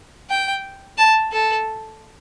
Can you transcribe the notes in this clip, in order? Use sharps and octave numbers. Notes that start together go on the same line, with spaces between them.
G5
A5
A4